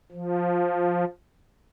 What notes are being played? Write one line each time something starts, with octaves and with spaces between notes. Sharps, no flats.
F3